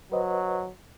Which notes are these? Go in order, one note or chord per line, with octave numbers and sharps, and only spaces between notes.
F#3 B4 C5 D#5